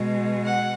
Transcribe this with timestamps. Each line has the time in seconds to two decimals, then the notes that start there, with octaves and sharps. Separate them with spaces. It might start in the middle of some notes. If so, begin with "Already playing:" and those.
Already playing: B2 G#3
0.45 F#5